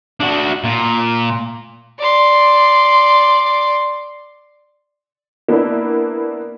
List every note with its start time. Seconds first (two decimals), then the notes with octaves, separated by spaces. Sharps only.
0.20 D4 F#4
0.64 A#2
1.99 D5 C6
5.48 A#3 B3 D4 E4